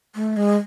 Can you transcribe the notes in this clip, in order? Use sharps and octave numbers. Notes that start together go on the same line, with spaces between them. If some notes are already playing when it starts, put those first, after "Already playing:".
A3
G#3